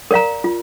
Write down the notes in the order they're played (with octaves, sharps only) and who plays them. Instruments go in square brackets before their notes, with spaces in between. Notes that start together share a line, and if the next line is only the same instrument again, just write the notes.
[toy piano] A#4 D5 F5 A#5
F4